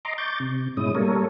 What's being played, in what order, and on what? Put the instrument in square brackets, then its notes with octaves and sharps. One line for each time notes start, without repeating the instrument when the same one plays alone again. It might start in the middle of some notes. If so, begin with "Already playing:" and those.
[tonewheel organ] D#5 A#5 C6 D6
C#6 D6 G6 A6
C3
G#2 B2 G#3 C#4 E4 D#6
G3 A#3 A4 A#4 C#5